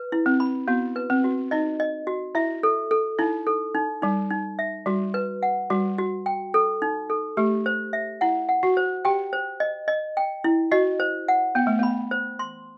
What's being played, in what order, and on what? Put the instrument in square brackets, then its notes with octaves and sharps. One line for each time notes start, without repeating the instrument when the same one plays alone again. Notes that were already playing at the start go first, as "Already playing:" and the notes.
Already playing: [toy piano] B4
E4
[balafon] C4
[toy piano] B5
[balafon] B3 [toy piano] F#4
[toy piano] B4
[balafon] C4
[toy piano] F#4
[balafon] D#4 [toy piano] D#5
[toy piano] D#5
F#4
[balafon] E4 [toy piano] E5
[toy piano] A4
A4
[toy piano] D#4 [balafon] E4
[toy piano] A4
D#4
[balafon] G3 [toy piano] D#4
[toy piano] D#4
E5
[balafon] G3 [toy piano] F#4
[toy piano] B4
F#5
[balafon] G3 [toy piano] F#4
[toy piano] F#4
G5
A4
D#4
A4
[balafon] A3 [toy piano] G4
[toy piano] C5
E5
[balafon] E4 [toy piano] F#5
[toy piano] F#5
[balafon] F#4
[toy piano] C5
[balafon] G4 [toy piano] G5
[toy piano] C5
D#5
D#5
G5
E4
[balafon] F#4 [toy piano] D#5
[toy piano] C5
F#5
[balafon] B3 [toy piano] G5
[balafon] A3
[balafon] B3 [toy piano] B5
[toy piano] C5
C6